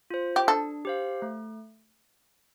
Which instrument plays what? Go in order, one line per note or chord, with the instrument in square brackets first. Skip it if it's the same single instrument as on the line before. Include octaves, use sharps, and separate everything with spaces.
[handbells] F4 C5
[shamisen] G4
[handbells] D4 [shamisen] A4
[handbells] G4 C5 F5
A3